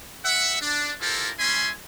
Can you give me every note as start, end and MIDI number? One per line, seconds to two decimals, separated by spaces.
0.25 0.57 76
0.25 0.57 78
0.61 0.94 62
1.01 1.30 64
1.01 1.30 65
1.01 1.30 67
1.01 1.30 69
1.01 1.30 70
1.01 1.30 72
1.39 1.70 55
1.39 1.70 61
1.39 1.70 64
1.39 1.70 80
1.39 1.70 83
1.39 1.70 84